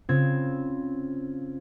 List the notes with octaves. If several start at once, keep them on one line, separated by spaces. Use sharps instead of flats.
C#3 C4 F4 G#6